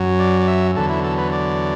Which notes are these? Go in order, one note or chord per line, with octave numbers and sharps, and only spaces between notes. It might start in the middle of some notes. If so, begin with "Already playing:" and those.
Already playing: F#2 F#3
D5
D5
E5
E2 D3 F#3 A4
E4
A4
B4
D5